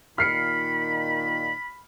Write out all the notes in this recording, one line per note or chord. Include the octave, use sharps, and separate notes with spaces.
A#2 D#3 B5 F6 C7 C#7